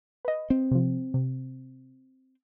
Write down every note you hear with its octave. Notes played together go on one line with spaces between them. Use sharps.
B4 D#5
C4
C3 F3
C3